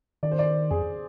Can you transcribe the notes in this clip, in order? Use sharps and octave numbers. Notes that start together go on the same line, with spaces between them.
D#3 D5
C5
D5
F2 G#4